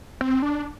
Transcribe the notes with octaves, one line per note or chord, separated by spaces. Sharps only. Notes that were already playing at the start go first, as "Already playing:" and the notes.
C4
D4